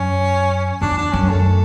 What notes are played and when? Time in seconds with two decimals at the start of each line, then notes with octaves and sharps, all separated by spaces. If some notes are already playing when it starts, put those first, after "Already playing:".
Already playing: F#2 C#4
0.82 E2 D4
0.98 D4
1.13 F#2 C#4
1.29 A3